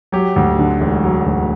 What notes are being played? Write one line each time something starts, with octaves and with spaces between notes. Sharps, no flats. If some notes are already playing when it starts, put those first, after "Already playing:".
F#3 G4
D2
D3
E1
F#3
D2